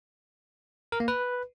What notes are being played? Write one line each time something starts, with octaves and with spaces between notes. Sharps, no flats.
A#4
A#3
B4